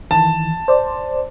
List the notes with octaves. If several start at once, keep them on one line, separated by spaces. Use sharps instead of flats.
D#3 E3 A5
C5 D5